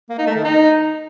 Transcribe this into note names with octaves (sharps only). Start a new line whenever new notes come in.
A#3
D#4
A3
D#3
D#4